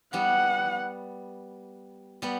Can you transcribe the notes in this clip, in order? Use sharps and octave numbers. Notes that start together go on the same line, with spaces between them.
G3 B3 F#5
G3 B3